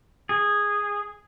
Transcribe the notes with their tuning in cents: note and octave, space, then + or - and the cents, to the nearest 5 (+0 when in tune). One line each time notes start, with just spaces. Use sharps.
G#4 -10